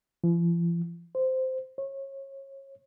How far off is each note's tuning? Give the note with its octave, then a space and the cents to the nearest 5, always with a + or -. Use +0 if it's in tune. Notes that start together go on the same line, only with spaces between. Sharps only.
F3 -45
C5 -10
C#5 -30